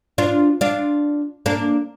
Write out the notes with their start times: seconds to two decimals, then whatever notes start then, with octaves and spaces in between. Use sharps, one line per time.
0.18 D4 F4
0.61 D4 F4
1.46 A#3 D4